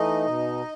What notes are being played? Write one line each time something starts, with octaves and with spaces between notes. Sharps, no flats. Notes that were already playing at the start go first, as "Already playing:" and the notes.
Already playing: E3 A3 D#4 D#5
B2